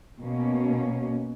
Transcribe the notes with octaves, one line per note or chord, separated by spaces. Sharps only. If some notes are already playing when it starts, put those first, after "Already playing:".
B2 A#3 C#4